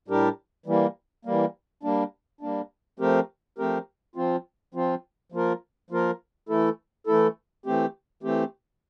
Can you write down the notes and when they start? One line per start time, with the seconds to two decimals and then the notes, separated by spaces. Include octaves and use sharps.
0.08 A2 G3 D4 G4 A#4
0.66 E3 G3 A#3
1.25 E3 G3 A#3
1.83 G3 A#3 D4
2.41 G3 A#3 D4
2.99 F3 A3 C4 G4 A#4
3.58 F3 A3 C4 G4 A#4
4.16 F3 C4 F4
4.74 F3 C4 F4
5.32 F3 A#3 F4 A#4
5.91 F3 A#3 F4 A#4
6.49 E3 A3 E4 A4
7.07 E3 A3 E4 A4
7.66 E3 A3 C4 G4
8.23 E3 A3 C4 G4